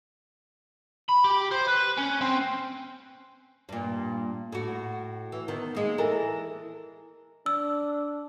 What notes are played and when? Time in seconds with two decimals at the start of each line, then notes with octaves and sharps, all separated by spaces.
1.09 B5
1.24 G4
1.51 C5
1.68 B4
1.97 C#4
2.21 C4
3.69 G2 A#2
4.52 A2 F#4
5.32 E3
5.48 D#3 B3
5.75 G#3 A#3
5.98 E3 A4 A#4
7.46 D4 E6